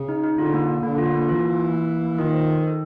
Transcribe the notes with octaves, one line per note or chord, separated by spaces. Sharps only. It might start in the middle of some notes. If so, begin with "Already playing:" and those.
Already playing: C#3
D#4
D#4
D3 F4
A#3
D4
D3 A#3
F4
A#3
E3 F4
A#3
A#3
A#3
A#3
A#3
D#3 F4
C5
A4
A4